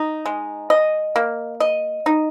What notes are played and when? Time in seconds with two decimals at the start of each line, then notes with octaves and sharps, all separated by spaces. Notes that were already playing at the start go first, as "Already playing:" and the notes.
Already playing: D#4
0.26 G#3
0.70 D#5
1.16 A#3
1.60 D#5
2.06 D#4